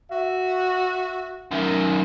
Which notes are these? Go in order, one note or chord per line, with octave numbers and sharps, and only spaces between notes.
F#4 E5
F#2 D#3 E5